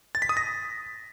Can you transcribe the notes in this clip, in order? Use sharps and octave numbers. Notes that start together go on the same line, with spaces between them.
A6
B6
D#6
A#6